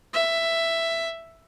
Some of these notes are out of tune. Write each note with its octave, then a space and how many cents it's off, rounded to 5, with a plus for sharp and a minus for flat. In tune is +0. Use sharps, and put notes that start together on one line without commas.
E5 +10